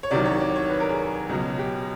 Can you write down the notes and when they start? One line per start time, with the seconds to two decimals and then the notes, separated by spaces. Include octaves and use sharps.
0.03 C#5
0.11 C2 C3 D#3 F#3 D5
0.25 C#5
0.40 D5
0.56 C#5
0.70 B4
0.80 A#4
0.89 G#4
1.29 C#2 B2 F#3
1.59 G4